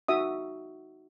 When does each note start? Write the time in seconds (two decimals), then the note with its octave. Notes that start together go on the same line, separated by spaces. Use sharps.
0.08 D#4 F#4 E5 D#6